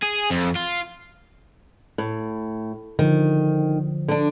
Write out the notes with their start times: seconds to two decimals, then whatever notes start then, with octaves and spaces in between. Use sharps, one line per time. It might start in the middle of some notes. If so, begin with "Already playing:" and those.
0.02 G#4
0.30 F2
0.55 F4
1.98 A2
2.99 D3 D#3 F3
4.08 D3 D4